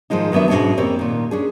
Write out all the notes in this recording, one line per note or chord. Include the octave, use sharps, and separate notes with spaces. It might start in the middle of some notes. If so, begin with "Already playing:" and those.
G#2 D#3 F3 G#3 D#4
D#3 F#3 B3 D4 E5
G#2 B2 G#3 C#4 D4
F2 A#3 C4 G4 C#5
A#2 D#3
C#4 D4 G#4